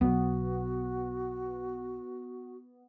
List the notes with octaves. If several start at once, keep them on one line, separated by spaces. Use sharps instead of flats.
B1 F#3 B3 F#4